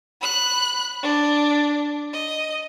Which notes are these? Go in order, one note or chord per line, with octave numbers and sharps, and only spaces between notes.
B5 F#6
D4
D#5